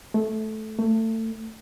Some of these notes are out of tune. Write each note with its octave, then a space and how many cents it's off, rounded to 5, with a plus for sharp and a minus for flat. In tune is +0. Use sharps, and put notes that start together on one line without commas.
A3 -15
A3 +25